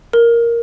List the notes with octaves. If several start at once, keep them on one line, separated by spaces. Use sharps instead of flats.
A#4